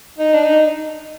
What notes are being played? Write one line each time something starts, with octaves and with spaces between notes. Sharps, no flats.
D#4
D4
D#4